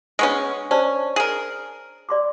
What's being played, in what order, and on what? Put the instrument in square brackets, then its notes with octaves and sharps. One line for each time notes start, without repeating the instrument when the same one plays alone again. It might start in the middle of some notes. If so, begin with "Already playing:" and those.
[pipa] G#3 B3 C#4 [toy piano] D4 C#6 D#6
[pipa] C#4 [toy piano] C5 D5 A5
[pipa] G#4 A#4
[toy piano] D5 C6 D6